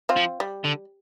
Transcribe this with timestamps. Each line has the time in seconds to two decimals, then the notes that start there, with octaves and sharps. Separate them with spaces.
0.09 C4 F4
0.17 F3
0.40 G3
0.65 D3